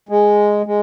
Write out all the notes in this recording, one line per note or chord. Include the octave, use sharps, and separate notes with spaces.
G#3
G#3